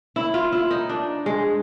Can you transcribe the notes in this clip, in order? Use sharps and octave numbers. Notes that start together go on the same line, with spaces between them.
E4
F4
E4
D#4
D4
G#3